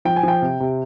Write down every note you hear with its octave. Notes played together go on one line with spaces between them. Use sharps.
F3 G5
G#5
F3 G5
C3
C3